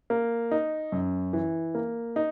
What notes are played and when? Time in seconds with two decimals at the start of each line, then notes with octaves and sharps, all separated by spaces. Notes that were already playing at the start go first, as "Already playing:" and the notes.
0.10 A#3
0.51 D#4
0.92 F#2
1.33 E3
1.75 A#3
2.16 D#4